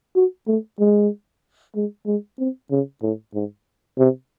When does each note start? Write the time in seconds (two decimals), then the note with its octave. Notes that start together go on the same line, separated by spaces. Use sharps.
0.16 F#4
0.47 A3
0.79 G#3
1.76 G#3
2.06 G#3
2.39 C4
2.71 C#3
3.02 A2
3.34 G#2
3.98 C3